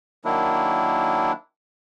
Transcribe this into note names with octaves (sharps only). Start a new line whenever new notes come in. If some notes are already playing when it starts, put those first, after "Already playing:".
D#3 F#3 A#3 D4 E4